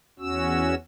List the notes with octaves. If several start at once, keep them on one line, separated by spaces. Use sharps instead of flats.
E2 C#4 F#4 E6